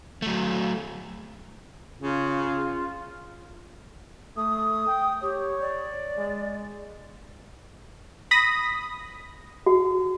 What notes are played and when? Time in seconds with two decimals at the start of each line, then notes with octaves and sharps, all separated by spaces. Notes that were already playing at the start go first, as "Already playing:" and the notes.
0.22 F#3 A3
2.01 C#3 F4
4.37 A3 D#6
4.87 G5
5.22 G4 C#5
5.61 D5
6.17 G#3
8.31 B5 D#6 A#6
9.66 F#4